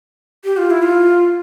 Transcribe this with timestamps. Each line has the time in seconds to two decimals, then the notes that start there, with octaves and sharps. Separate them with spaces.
0.45 G4
0.57 F4
0.71 E4
0.82 F4